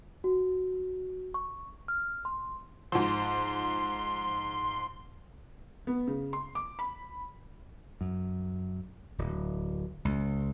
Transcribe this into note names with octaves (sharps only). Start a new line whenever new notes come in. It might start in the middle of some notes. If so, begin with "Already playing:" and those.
F#4
C#6
F6
C6
G#2 F3 C6
B3
C#3
C6
D6
B5
F#2
D1
C#2